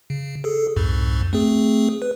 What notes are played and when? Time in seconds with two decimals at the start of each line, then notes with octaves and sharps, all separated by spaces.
0.10 C#3
0.44 G#4 A4
0.76 C2 F2 G#2
1.33 A3 C4 G#4
2.02 B4